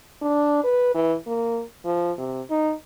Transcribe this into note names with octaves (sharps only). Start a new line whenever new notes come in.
D4
B4
E3
A#3
F3
C3
D#4